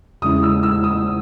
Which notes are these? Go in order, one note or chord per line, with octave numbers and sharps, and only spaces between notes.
E2 C#3 G#3 C#4 E4 D#6
E6
E6
D#6